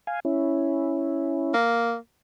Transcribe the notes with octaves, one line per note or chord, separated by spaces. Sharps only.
F5 G#5
C#4 E4
A#3